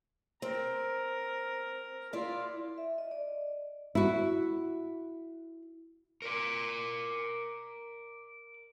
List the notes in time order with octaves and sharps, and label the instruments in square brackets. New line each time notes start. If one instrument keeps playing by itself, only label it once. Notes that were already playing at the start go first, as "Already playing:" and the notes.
[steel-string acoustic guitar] C4 [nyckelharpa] A#4
[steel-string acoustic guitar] E4 D5 [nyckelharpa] F4
[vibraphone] E5
D#5
D5
[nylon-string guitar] E4 F#4
[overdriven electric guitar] A#4 D5